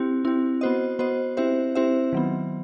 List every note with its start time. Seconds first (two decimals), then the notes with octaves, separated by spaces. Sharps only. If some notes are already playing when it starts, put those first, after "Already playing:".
Already playing: C4 E4 G4
0.24 C4 E4 G4
0.61 B3 F#4 C5 D#5
0.99 B3 F#4 C5 D#5
1.37 C4 E4 G4 C5 E5
1.75 C4 E4 G4 C5 E5
2.13 D#3 F#3 B3